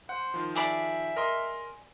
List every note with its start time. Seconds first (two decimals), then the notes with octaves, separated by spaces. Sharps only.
0.09 C5 F#5
0.34 D#3 F3
0.55 G#4 D5 E5 B5
1.16 A#4 D#5 C6